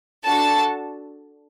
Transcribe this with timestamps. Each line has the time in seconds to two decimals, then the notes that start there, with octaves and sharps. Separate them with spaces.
0.25 D4 F#4 A4 A5